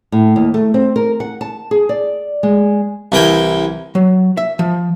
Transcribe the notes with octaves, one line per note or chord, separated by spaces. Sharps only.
A2
D#2
A3
C4
A#4
F#5
A5
G#4
D5
G#3
C2 E3 A#4 G5 G#5
F#3
E5
F3